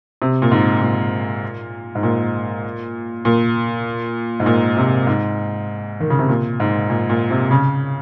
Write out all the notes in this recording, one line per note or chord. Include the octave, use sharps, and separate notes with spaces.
C3
A#2
G#2
A#2
G#2
A#2
A#2
G#2
A#2
C3
G#2
D#3
C#3
C3
A#2
G#2
A#2
A#2
C3
C#3